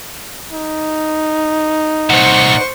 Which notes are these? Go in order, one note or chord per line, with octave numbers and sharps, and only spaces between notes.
D#4
C2 A#2 C5 F#5 C#6